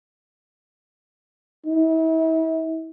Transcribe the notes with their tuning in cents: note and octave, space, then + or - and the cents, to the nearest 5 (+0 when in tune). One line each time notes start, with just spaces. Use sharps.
E4 -40